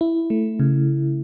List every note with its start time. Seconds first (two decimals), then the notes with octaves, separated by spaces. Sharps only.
0.01 E4
0.30 A3
0.60 C#3